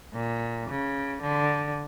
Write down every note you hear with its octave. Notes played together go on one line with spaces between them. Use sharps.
A#2
C#3
D3